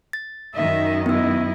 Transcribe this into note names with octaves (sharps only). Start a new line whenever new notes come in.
A6
F#2 D#3 D#5 E5
B3 E4 E6